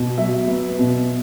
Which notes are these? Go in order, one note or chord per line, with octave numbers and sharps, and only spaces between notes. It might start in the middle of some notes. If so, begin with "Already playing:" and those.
Already playing: B2
F#3 E5
B3
B2